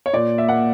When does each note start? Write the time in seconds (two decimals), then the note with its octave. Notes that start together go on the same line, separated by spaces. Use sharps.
0.06 C#5
0.13 A#2 D5
0.38 E5
0.48 A#3 F#5